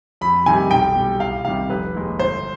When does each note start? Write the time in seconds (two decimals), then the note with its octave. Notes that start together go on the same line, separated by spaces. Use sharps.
0.21 F2 B5
0.46 C3 D#3 G3 G#5
0.70 B1 G5
0.95 B2 G3
1.20 C2 F5
1.45 C3 D#3 G3 F5
1.70 F1 B4
1.95 D#2 D#3 G#3
2.19 G1 C5